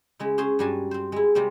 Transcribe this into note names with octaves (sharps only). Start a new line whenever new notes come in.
C#3 G#3 E4
C#4 G#4 C5 C6
G2 F#3 G3 F#4 G#5 A5
C4 C5
G#3 E4
C3 G3 G#3 C4